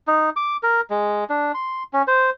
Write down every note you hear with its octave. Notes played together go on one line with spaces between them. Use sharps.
D#4
D6
A#4
G#3
D4
C6
C#4
C5